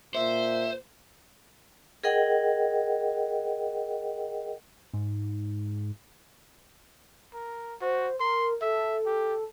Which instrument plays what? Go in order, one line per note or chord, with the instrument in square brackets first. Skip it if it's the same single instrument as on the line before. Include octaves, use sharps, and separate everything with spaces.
[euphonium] A#2 [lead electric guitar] C5 [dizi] E5
[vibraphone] G#4 A#4 D#5 F#5 G5
[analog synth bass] G#2
[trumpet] A#4
[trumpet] F#4 [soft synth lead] C5
[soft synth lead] A#4 [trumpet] C6
[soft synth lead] A4 [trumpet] E5
[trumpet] G4